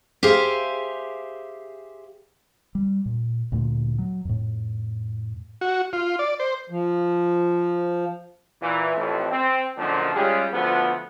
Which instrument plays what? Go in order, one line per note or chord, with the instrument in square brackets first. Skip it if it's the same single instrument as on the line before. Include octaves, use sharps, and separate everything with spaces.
[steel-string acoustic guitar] G4 G#4 C5 E5 F5
[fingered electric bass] G3
A#2
D2 A#2 A3
F#3
F2 A2
[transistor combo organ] F#4
F4
D5
C5
[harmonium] F3
[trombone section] A#2 E3
A1 F2
C4
F#2 A#2 D3 D#3 F3
G3 G#3 C#4 F4 G4 G#4
D2 F3 B3